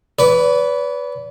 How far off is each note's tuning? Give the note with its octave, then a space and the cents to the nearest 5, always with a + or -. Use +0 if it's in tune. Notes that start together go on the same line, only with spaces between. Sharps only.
B4 +0 D5 -40